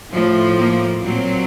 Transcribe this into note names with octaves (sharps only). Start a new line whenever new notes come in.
A2 F3
A#3
A#2 F#3 C4